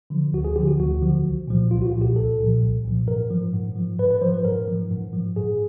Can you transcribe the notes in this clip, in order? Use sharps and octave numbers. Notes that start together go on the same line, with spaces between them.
D3 F3
D2 F#4
G#4
D3 F3 G4
F#4
D2 F#4
D3 F3
C2
A#2 F3
C2 F4
F#4
F4
A#2 F3
G4
C2 A4
A#2 F3
C2
A#2 F3
G#2 A#4
F3
G#2
F3
G#2 B4
B4
F3 C5
B4
G#2 A#4
F3
G#2
F3
G#2 G#4